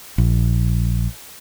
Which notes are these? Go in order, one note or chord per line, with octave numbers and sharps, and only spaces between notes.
A#1